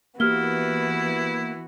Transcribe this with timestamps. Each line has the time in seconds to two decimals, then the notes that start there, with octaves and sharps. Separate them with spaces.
0.20 E3 A#3 B3 E4 F#4 G4 F6 G7